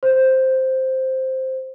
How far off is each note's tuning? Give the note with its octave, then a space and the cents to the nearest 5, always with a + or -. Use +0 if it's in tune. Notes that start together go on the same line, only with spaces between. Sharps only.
C5 +0